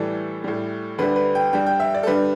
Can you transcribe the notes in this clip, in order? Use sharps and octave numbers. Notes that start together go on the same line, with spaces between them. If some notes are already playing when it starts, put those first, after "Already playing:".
Already playing: A2 E3 G3 A4
A2 G3
D2 D3 G3 B4
B4
G5
G2 G3 G5
G5
E5
D5
A4
G2 D3 G3 B4